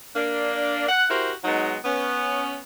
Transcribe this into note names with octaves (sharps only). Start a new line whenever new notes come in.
A#3 D4
F#5
E4 F#4 G4 A#4 C5
F#3 G#3 B3 D#4
B3 C#4